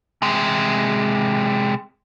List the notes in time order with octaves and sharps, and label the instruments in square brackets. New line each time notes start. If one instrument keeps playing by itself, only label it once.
[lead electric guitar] C3 G#3